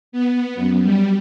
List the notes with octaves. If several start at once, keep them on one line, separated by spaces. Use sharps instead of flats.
B3
F#2
G3